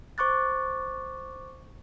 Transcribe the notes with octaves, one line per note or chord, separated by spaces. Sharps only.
C5 C#6 D6 F#6 A6